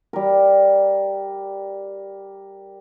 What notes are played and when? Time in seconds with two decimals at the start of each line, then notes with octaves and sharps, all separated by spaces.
0.13 G3 A#4